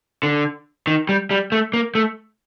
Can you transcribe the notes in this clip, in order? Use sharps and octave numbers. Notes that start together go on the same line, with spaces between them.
D3
D#3
G3
G3
A3
A#3
A3